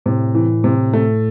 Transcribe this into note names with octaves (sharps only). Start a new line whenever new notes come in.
A2 C3
E3
C3
A3